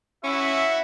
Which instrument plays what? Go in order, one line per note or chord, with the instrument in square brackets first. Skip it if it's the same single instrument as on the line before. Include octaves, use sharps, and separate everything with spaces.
[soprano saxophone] C#4 [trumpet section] E4 F#4 E5